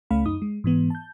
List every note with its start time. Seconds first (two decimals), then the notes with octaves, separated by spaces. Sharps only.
0.10 C#2 A3 C#4 F5 B5
0.26 F#2 D#4 D#6
0.42 G#3
0.64 G#2 E3 B3
0.90 A5 G6